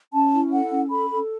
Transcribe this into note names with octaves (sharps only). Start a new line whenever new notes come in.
C#4 A5
E4
A4 F#5
C#4
A4 B5
A4